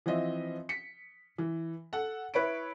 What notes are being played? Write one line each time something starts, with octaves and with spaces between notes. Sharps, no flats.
E3 F3 C4 D#5 E5
B6 C#7
E3
A4 F#5
E4 B4 C#5 B5 D7